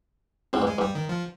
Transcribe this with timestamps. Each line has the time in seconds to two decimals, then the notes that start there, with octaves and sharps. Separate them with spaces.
0.53 G#2 C4
0.62 G2
0.67 G#3
0.78 G2 G3
0.95 D#3
1.09 F3